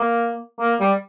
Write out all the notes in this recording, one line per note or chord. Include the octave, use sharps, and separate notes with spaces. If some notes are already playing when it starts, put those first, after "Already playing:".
Already playing: A#3
A#3
G3